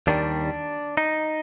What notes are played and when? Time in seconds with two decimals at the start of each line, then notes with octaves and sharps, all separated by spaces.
0.07 D#2 D#3 G3 D4
0.97 D#4